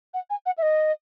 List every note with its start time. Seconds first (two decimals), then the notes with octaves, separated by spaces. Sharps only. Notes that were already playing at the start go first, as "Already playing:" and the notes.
0.14 F#5
0.30 G#5
0.46 F#5
0.58 E5
0.62 D#5